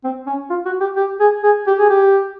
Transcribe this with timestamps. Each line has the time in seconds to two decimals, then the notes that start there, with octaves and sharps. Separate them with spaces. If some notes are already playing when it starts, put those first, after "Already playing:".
0.04 C4
0.27 C#4
0.50 F4
0.65 F#4
0.80 G4
0.96 G4
1.20 G#4
1.43 G#4
1.67 G4
1.79 G#4
1.89 G4